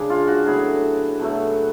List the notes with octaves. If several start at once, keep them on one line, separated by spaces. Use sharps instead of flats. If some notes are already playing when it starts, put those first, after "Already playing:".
Already playing: C#3 G#3 D4 G#4
F4
F#4
A2 F#3 B3 G#4
B2 F#3 A3